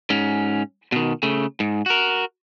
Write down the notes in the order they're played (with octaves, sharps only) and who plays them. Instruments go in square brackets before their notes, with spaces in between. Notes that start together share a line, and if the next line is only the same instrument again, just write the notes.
[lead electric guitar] G#2 C#4
B2 D#3
C#3 A3
G#2
F#4 A#4